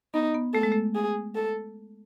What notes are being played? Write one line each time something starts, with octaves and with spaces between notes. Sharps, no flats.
B3 D#4
B3
A3 A4
G#3
A3
G#4
A4